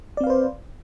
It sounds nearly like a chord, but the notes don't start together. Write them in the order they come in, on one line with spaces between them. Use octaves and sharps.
D5 C4 F5 B4 C5